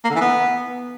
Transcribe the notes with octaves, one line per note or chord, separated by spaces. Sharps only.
A#3
D3
E3
B3